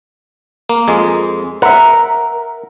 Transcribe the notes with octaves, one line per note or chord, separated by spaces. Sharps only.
A#3
F2 G#3
A#4 E5 F#5